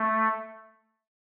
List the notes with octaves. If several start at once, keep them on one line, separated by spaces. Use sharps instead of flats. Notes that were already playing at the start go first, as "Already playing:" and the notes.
Already playing: A3